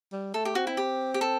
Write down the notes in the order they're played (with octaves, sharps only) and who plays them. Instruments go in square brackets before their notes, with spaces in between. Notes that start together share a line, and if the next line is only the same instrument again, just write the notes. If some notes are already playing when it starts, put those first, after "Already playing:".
[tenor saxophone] G3
[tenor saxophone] A3 [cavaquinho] A4
[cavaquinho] G4
[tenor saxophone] C4 [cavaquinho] F#4
[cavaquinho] E4
G4
G4
A4